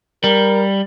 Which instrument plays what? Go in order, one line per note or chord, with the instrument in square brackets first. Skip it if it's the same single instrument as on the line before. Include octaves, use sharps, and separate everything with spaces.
[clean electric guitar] G3 [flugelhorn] A#4